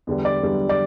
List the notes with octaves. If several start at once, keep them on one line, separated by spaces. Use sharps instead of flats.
E2 D3 G3
D5
E2 D3 G3
D5